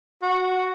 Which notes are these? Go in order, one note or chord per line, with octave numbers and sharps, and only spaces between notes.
F#4